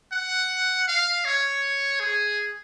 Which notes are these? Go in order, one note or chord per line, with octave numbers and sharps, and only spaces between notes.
F#5
F5
C#5
G#4